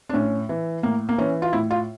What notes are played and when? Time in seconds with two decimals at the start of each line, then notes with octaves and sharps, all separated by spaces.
0.09 D4
0.13 A2 C#4
0.49 E3
0.83 A2 A#3
1.09 A#3
1.18 E3 C#4
1.42 F4
1.53 A2 E4
1.71 F4